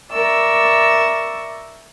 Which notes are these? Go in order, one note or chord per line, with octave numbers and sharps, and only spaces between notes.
A#4 D5 E5 C#6 E6